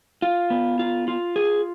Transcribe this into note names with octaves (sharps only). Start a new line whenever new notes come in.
F4
B3
F4
F4
G#4